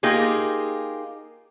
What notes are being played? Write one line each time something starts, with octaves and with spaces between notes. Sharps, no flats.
A#3 D#4 F4 G4 G#4